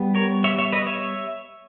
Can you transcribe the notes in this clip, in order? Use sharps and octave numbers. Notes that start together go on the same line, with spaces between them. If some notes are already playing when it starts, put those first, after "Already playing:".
Already playing: G3 B3
A#4 C#5
C#5 E5
C#5 E5
B4 D#5
C#5 E5